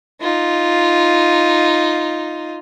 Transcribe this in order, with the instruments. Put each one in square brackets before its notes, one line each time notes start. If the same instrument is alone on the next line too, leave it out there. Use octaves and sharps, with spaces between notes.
[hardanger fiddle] D#4 F4